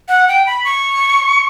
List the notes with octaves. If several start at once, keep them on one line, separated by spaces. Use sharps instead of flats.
F#5
G5
B5
C#6